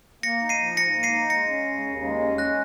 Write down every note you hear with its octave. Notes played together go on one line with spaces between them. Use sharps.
A#3 A#6 C#7
D#4
C7 D#7
F3
G#2 A#6 C#7
A#3
C7 D#7
D#4
G#3 A#6 C#7
C#4
C#3
D#2
G#3
C#4
G#3 F#6 A#6